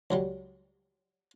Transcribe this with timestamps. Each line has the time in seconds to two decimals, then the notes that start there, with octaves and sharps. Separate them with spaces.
0.11 C#2 F#3 G3